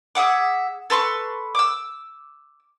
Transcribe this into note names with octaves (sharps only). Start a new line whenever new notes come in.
G#4 E5 F#5 D6
A4 B4 C6 C#6
D6 E6